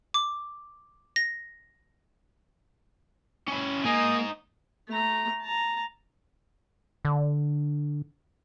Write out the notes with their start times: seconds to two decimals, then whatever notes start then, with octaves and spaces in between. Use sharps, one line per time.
0.14 D6
1.16 A#6
3.48 C#4 E4
3.85 A#3 D#4 G#5 D#6
4.89 A3 A#5
5.41 A5 A#5
7.05 D3